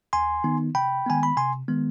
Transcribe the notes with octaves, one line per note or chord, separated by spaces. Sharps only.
D#2 G#5 C6
D#3 B3 D#4
C3 G5 B5
D#3 G#3 B3 G#5
B5
C3 G#5 C6
D#3 G#3 B3